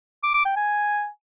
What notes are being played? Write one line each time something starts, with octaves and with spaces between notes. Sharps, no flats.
D6
D6
G5
G#5